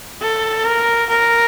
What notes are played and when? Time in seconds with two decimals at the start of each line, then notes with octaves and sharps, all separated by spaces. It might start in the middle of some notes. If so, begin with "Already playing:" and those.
0.21 A4
0.65 A#4
1.09 A#4